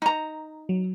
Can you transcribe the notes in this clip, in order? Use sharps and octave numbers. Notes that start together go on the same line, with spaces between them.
D#4 A#5
F#3